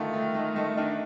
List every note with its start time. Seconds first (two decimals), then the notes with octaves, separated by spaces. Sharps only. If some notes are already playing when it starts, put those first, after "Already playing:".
Already playing: D3 D#3 A3 F4
0.13 A3
0.34 A3
0.56 A3
0.77 D#3 D4